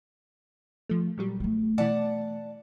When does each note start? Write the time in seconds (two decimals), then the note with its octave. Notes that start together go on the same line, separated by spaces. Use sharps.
0.89 F3 A3
1.18 A#2 F#3 G3
1.40 A3 B3
1.78 B2 E3 D5 F#5 A5